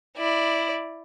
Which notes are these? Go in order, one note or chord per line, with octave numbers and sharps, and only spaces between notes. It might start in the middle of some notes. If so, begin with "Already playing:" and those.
E4 D5